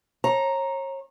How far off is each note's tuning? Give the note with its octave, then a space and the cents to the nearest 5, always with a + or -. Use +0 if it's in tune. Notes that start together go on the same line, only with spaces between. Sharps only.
C#5 -35 A#5 +0